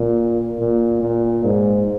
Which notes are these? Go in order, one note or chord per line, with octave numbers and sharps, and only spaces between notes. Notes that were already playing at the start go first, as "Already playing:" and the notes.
Already playing: A#2
A#2
A#2
G#2